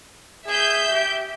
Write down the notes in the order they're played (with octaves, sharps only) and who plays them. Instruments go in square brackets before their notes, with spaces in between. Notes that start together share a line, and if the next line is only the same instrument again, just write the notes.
[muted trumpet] G#4 [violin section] E5 G6
[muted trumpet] G4